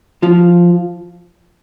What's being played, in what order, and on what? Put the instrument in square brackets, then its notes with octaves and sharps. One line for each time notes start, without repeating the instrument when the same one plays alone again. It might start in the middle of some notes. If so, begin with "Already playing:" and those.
[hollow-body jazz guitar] F3 F4